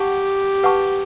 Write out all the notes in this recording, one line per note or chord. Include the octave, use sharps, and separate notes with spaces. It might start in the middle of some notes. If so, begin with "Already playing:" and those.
Already playing: G4 F#5 A5 C#6
B4 F#5 A5 C#6